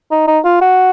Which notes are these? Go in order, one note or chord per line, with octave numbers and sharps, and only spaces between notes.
D#4
D#4
F4
F#4